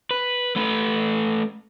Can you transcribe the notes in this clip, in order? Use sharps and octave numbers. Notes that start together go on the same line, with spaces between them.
B4
A3 B4